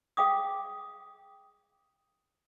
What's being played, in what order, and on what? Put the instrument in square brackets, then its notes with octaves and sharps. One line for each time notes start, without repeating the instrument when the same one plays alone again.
[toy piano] G#4 F5 G5 D6 D#6